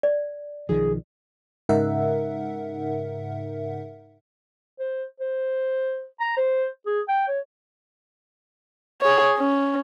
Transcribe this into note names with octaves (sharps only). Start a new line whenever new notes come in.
D5
B1 D#3 F3 G#4
G#2 C#3 D#4 A#4 E5 F#5
C5
C5
A#5
C5
G#4
G5
C#5
G#4 C#5
C#4